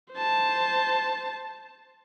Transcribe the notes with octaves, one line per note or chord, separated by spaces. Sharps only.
C5 A5